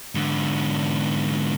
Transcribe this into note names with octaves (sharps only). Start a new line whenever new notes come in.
G#2 D3